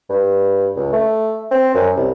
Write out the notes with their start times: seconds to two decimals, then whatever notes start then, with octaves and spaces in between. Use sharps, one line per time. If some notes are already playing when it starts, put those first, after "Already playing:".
0.10 G2
0.76 C#2
0.92 A3
1.51 C4
1.74 F#2
1.96 C2